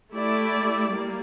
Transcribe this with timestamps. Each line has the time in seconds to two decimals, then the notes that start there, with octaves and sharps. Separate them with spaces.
0.11 A3 E4 G4 D5
0.92 G3 A#3